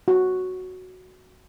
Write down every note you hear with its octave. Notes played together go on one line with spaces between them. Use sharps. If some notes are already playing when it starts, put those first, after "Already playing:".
F#4